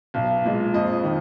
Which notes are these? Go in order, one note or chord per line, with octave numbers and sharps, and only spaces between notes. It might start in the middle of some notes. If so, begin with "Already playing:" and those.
B1
A#2 G#3
F2 D#5
D#3